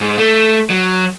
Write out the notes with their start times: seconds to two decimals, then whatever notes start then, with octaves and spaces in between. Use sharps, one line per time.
0.01 G#2
0.18 A3
0.70 F#3